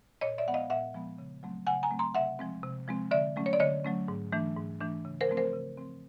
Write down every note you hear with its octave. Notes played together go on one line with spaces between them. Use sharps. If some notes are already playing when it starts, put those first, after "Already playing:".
A#2 C#5 D#5
D5 E5
F3 G#3 B3 F#5
D#5 F5
A#2 E5 F#5
F3 G#3 B3
C#3
F#3 A3 C4
C#3 F#5 G#5
G#5 A#5
F#3 A3 C4
A#5 C6
C3 E5 F#5
F3 G#3 C4
C3
F3 G#3 C4
D3 D5 E5
F#3 A3 C#4
C#5
D5
D3 C#5 D#5
F#3 A3 C#4
G#2
E3 A3 D4
G#2
E3 A3 D4
C#3
A#4 C5
F3 A3 C4
A#4 C5
C#3
F3 A3 C4